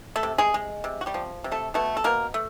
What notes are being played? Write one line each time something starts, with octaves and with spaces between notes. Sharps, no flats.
A3 A4
C3
G#3 G#4
G#3
C3
F#4
G3 G4
F3
C3
A3 A4
B2 A3 A4
A4
B2 A#3 A#4
A3